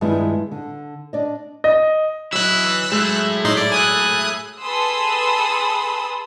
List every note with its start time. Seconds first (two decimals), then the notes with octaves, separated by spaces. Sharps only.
0.01 G2 D#3 G#3 B3 E4 F4
0.51 D3
1.13 D4 D5 D#5
1.64 D#5
2.33 F#3 E4 F#4 D#5 E6 F#6
2.64 E3
2.92 F#3 G#3 A3 E4
3.45 A2 D#4 C6
3.57 D5
3.72 G#5 D#6 F#6
4.61 G#4 A4 B4 C6 D#6 E6